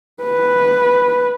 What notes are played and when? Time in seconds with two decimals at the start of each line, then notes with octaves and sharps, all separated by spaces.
0.24 B4